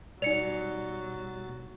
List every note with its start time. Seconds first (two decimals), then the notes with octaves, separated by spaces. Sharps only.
0.22 B2 F#3 G3 D#4 D5 A6 C#7 F7